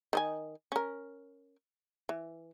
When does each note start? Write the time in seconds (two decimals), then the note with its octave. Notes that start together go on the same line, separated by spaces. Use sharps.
0.13 D#3 D#5 G#5
0.72 C#4 A#4
2.09 E3